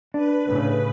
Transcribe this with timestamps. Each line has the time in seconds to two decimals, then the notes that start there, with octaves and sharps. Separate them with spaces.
0.14 D4 B4
0.46 A2 C#3